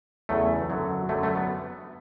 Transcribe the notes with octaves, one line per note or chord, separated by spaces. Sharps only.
E2 C#3 F#3 A3
F#2 D3 F#3
F#2 D3 F#3 A3
A3
B3